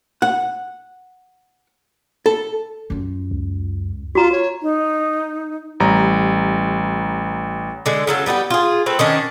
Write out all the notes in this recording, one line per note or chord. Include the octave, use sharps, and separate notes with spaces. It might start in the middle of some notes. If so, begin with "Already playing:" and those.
F#5
A4
F#2 F4
C#2
B3 F4 F#4 A#5
C#5
D#4
A1 G3 A#5
D3 G#3
C#3 F#3 A4
G3 B3 D#4 G4
F4 G#4
A3 C4 B4
D#3 C#4 D4